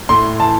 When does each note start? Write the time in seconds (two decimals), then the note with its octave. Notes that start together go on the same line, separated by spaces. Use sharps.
0.09 A2 C6
0.40 E3 A5